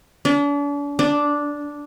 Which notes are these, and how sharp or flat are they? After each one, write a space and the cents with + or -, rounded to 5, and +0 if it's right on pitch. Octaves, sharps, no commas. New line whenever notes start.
D4 -40
D4 -5